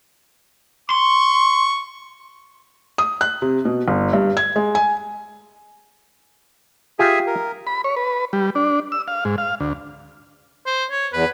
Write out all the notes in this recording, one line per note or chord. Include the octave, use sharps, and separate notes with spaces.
C6 C#6
D#6
F#6
C3
B2
G1
G2
G#6
G#3
G#5
F4 G4 G#4 E5 G#5
A#4
B5
C#5
B4
G3
D4
E6
F5
G#2
F5
D2
C5
C#5
E2 B4